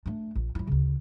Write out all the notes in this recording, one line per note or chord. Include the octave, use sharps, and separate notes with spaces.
A3 D4
A#1
F#3 E4
D2 C#3